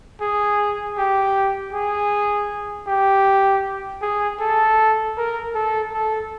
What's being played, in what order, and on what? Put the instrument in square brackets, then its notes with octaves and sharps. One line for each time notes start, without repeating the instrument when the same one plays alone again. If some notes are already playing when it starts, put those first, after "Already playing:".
[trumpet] G#4
G4
G#4
G4
G#4
A4
A#4
A4
A4